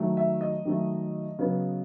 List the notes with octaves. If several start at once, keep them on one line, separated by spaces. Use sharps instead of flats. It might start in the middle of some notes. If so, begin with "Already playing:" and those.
Already playing: D#3 F#3 A3
E5
D#5
D#3 F#3 A3
C#3 F#3 B3